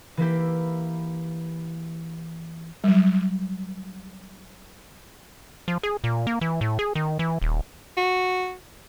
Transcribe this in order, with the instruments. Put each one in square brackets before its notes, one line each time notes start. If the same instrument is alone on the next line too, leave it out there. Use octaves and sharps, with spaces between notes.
[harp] E3 A#3 E4 G4
[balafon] F#3 G3
[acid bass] F3
G#4
A#2
A#3
E3
A2
G#4
D#3
E3
D#1
[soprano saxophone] F#4